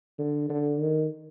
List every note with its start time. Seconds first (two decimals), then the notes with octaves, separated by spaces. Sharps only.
0.19 D3
0.49 D3
0.79 D#3